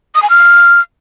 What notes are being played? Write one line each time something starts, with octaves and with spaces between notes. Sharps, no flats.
D#6
G#5
F6